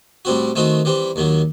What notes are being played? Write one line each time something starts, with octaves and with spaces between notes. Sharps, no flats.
A2 G3 C4 F#4
D#3 A3 C4 D#4 F#4
E3 G3 C4
D#2 D#3 F#3